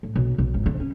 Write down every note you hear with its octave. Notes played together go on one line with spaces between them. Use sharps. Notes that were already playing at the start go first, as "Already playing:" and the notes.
A2
B1
B1
G#1
D3
C4 C#4